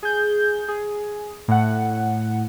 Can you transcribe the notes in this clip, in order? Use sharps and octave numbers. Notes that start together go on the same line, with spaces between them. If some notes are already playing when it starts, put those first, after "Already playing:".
G#4 G6
G#4
A2 F#5